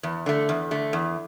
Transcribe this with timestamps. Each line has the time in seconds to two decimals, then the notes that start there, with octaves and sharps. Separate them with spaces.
0.03 E2
0.26 D3 A3
0.49 E2
0.71 D3 A3
0.93 E2